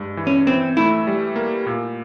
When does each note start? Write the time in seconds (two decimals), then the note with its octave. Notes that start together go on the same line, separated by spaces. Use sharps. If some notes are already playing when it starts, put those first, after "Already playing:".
Already playing: G2 G#3
0.17 E3
0.27 C#4
0.47 E3 C4
0.77 A3 E4
1.07 G3
1.36 A#3
1.66 A#2